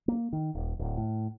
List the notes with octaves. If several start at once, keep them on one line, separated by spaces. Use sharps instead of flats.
A#3
D#3
D#1
D1
A2